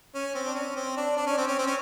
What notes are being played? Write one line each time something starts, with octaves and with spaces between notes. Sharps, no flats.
C#4
C4
D4
C#4
C4
D4
D4
C#4
C4
C#4
C4
C#4